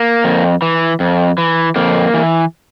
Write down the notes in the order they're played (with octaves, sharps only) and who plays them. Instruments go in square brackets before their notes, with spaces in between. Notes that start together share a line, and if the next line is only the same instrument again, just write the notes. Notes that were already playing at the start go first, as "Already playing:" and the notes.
Already playing: [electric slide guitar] A#3
F2
E3
F2
E3
F2 A#3
E3